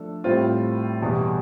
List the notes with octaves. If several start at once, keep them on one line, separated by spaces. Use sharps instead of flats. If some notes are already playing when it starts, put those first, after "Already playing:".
Already playing: F3 A3 D4 A4
A2 G3 C4 F4 C5
E2 B2 G3